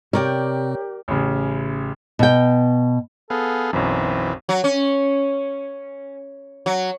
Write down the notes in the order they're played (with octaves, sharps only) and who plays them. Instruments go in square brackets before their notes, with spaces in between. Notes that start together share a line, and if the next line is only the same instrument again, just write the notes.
[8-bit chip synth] C3 C4 [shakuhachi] G4 [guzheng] A#4 D5 G5 [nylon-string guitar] C#5
[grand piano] A1 C#3
[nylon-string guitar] B2 G5
[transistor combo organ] B3 G#4 F5 [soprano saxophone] A4
[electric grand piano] B1 F#2 [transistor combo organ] E3 [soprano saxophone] C4
[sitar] F#3
C#4
F#3